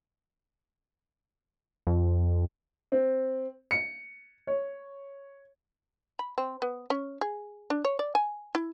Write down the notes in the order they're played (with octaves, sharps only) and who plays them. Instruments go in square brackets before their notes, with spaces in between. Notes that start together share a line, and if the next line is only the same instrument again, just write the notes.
[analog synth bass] F2
[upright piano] C4
C#7
C#5
[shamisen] B5
C4
B3
C#4
G#4
D4
C#5
D5
G#5
E4